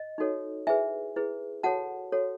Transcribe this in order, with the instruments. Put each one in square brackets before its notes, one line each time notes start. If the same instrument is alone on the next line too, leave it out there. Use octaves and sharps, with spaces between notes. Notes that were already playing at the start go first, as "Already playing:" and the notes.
Already playing: [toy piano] D#5
D#4 F#4 A4 C#5
E4 G#4 B4 E5 G#5
E4 G#4 B4
F#4 A4 C#5 F#5 A5
F#4 A4 C#5